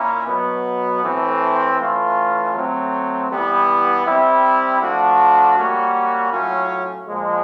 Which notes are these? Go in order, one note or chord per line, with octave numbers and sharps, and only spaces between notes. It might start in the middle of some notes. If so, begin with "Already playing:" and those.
Already playing: A#2 A#3 C#4 E4
B2 F#3 B3
A2 E3 A3 C4
E3 A3 C#4 F4
F#3 A3 C4
E3 G3 B3 E4
G3 C4 E4
F3 A3 D4 F#4
G3 A#3 C#4 F#4
A2 F#3 A3 C#4 F4
A#2 F3 G#3